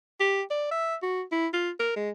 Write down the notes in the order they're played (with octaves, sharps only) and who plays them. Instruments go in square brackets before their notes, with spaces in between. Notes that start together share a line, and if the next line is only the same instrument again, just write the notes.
[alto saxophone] G4
D5
E5
F#4
E4
F4
A#4
G#3